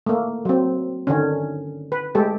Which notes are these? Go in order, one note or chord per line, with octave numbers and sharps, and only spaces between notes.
A3 A#3
F#3 C4
D3 D#3 C#4
B4
G#3 A3 G4 A4